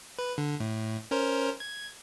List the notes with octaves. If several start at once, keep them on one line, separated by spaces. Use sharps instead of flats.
B4
D3
A2
C#4 A#4 C5
G#6